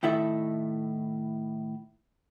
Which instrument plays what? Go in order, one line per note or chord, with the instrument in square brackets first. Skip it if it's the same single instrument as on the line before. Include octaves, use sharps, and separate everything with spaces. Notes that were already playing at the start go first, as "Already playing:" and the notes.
[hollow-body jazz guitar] A2 D#3 E4 A4 E5